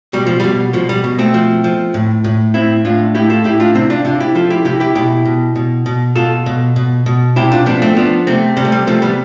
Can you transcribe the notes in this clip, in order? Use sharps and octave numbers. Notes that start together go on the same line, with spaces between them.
B2 G3
F3
B2 G3
B2 F3
G3
B2
A3 C4
F3
F3
A2
A2
A2 C4 E4
A2 D4 F4
A2 E4 G4
F4 A4
A2 E4 G4
D4 F4
C3 C4 E4
D4 F4
C3 D4 F4
E4 G4
F3 F4 A4
E4 G4
C3 E4 G4
E4 G4
B2 E4 G4
B2
B2
B2
B2 F4 A4
B2
B2
B2
C3 E4 G4
D4 F4
F3 B3 D4
A3 C4
F3 B3 D4
C3 A3 C4
C3 G3
A3
G3
C3 F3 A3
G3 B3